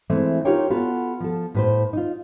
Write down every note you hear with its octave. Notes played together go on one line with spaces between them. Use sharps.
E3 G#3 A3 C4
D#4 F4 G4 A#4 C#5 G5
B3 F4 F#4 A4
F3 A4
A2 B4 C5
D#4 F4